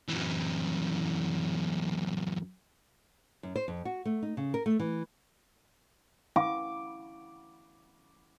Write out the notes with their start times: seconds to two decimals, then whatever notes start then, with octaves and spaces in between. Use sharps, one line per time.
0.08 F#2 E3
3.43 F#2
3.56 C5
3.68 F2
3.85 F#4
4.05 A3
4.22 D#4
4.37 C#3
4.54 A#4
4.66 A3
4.80 E3
6.36 F5 D6